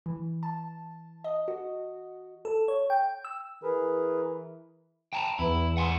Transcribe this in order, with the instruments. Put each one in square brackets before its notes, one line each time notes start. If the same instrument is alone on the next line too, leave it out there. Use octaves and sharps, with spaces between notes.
[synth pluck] E3
A5
D#5
F#4
[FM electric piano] A4
C#5
G5
E6
[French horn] E3 [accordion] G#4 A#4 B4
[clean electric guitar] G5 A5 A#5
[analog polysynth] E2 [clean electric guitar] E4
[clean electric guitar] F#5 G#5 C6